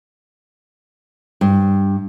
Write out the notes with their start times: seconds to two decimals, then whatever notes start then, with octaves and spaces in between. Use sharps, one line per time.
1.41 G2